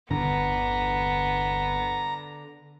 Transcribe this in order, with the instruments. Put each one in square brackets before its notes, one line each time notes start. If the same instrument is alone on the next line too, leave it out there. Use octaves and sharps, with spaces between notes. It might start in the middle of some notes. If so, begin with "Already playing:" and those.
[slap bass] G1 E2 [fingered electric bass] D3 [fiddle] B3 [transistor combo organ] A#5